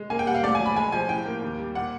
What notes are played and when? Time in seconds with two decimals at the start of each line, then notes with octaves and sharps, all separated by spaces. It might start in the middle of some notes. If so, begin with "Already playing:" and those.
Already playing: G#3
0.10 A#3 G#5
0.19 G5
0.26 G3 F#5
0.35 F5
0.43 A3 D5
0.55 G#5
0.59 F#3
0.66 B5
0.76 G#3 G#5
0.92 F3 G#5
1.08 A2 G5
1.25 A#3
1.42 D#2
1.59 G3
1.75 A#2 F#5